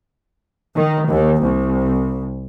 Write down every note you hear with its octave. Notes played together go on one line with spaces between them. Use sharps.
D#3
D#2
C2